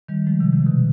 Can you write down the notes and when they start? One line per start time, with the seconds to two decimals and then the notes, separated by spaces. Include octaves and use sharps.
0.09 D#3 G3
0.27 F3 G#3
0.40 C3 D#3
0.53 C3 D#3
0.66 B2 D3